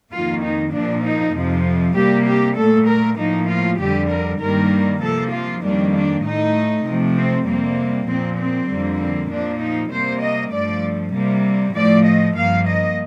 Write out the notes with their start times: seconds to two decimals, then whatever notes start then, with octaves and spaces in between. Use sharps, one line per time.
0.12 F2 D#3 A#3 F4
0.42 D#4
0.73 A#2 F3 A#3 D4
1.03 D#4
1.34 F2 C3 F3
1.95 C3 G3 A#3 G4
2.26 G4
2.57 A#2 A3 A4
2.87 A#4
3.18 A2 F3 A#3 D#4
3.50 F4
3.80 F2 D3 G3 G4
4.10 A#4
4.40 G2 D#3 G3 A#3 A#4
5.01 C3 F3 A#3 A4
5.32 F4
5.63 F2 D#3 G3 A#3 D4
5.94 D4
6.24 A2 A3 D#4
6.86 C3 F3 A3
7.16 C4
7.47 F2 C3 G3 A#3 C4
8.08 A#2 F3 A#3 C4
8.38 C4
8.70 F2 D3 G3 A#3
9.00 C4
9.30 A#2 F3 A#3 D4
9.61 D#4
9.91 C3 G3 A#3 C5
10.22 D#5
10.53 G2 F3 A3 D5
11.14 C3 G3 A#3
11.76 A2 F3 A3 D5
12.06 D#5
12.36 G2 F3 A#3 F5
12.67 D#5